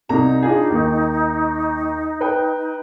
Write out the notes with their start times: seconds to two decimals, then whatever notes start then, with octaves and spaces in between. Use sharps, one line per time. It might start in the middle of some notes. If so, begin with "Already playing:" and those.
0.09 C2 D#4 A#5
0.42 D4 F4 G#4
0.70 D#2
2.21 B4 G5